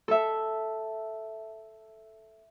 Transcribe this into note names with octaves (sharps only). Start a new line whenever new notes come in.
A4 E5